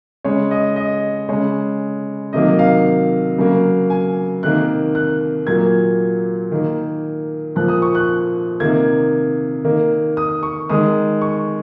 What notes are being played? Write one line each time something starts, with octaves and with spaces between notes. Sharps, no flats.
C#3 G#3 C#5
D#5
D#5
C#3 G#3 C#5
C3 D#3 F#3 A#3 D#5
F5
C#3 F#3 A#3
G#5
C3 D#3 A#3 F#6
F#6
A#2 F#3 A#3 G#6
D#3 A#3
A#2 F3 A#3 F#6
D#6
C#6
F#6
C3 D#3 A#3 G#6
D#3 A#3
D#6
C#6
D#3 G#3 D#6
C#6